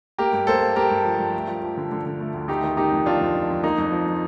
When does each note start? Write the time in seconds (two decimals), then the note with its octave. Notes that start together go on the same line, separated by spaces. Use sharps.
0.18 A#3 G4 A#4
0.33 G2
0.47 A#3 A4 C5
0.62 A#3
0.76 A#3 G4 A#4
0.90 G2
1.05 F3
1.19 G2
1.34 A3
1.48 F3
1.62 F3
1.77 D3
1.91 D3
2.06 D3
2.20 A3
2.34 D2
2.48 A3 D#4 G4
2.64 D#3
2.77 D#3 D#4 G4
2.92 F2
3.06 D#3 D4 F4
3.21 F2
3.35 F2
3.50 F2
3.64 A#3 D#4
3.78 F2
3.92 F3
4.07 F3